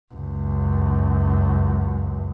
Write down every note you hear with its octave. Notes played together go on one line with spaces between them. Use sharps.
C#2 F#2